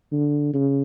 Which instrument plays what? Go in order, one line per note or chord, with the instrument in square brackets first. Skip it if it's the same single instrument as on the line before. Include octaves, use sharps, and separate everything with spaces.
[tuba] D3
C#3